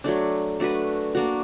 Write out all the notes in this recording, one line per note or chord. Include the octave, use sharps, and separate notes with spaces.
F#3 A3 D4
A3 D4 F#4 B4
A#3 D4 F#4